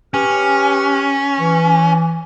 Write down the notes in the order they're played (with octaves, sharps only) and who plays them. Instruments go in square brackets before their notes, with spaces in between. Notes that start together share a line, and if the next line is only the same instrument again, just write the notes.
[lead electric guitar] C#4 [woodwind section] G4 B4 F6
[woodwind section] E3